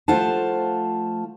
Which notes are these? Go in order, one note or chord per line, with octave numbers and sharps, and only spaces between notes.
F3 A3 F4 C5 F#5 A5